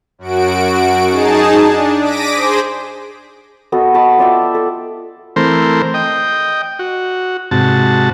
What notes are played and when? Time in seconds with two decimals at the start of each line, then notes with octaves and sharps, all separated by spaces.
0.18 F#2 F#4 D7
1.08 D#4 G#4 A5
1.64 D4
2.01 D6 A#6 B6 D7 D#7
2.30 G#4 C5
3.72 B3 F#4 A4 D#5
3.94 D#5 A5 B5 C#6
4.19 F4 D5 E5 G5
4.54 A4
5.36 E3 A3 C4 A#4 C5
5.94 D#5 G5
6.79 F#4
7.51 G#2 C3 F#4 A5